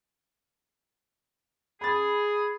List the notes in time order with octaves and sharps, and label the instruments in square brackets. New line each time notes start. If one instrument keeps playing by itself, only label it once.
[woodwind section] G#4 [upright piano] B5 A6